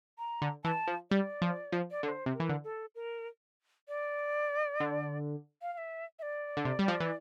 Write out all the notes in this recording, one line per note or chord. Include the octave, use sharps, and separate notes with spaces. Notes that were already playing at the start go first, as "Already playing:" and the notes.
A#5
D3
E3 A5
F3
G3 D5
F3
F3
D5
D3 D5
C5
C3
A#4
E3
D3
A4
A#4
D5
D3
F5
F5
E5
E5
D5
D3
C3
G3
F3
E3